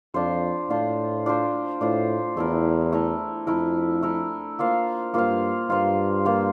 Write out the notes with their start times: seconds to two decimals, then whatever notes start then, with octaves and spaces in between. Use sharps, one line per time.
0.14 F2 D4 F4 C5
0.70 A2 D4 F4 C5
1.26 D4 F4 C5
1.81 A2 D4 F4 C5
2.36 E2 A3 E4 A#4
2.92 A3 E4 A#4
3.47 F2 A3 E4 A#4
4.03 A3 E4 A#4
4.59 A#3 F4 C5 F5
5.13 G2 A#3 F4 C5 F5
5.69 G2 A#3 F4 C5 F5
6.25 A#3 F4 C5 F5